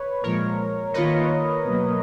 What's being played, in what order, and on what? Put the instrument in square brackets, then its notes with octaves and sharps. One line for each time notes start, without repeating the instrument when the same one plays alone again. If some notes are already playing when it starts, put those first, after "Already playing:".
Already playing: [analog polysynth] B4 C#5
[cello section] A#2 F3 G#3 [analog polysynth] A#4 C#5
[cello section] D#3 A#3 F4 A#4 C#5 [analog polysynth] B4 D#5
[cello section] B2 F#3 A#3